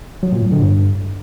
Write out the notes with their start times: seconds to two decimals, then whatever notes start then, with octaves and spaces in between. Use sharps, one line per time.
0.23 F#3
0.33 A#2
0.42 A2
0.52 D3
0.62 G2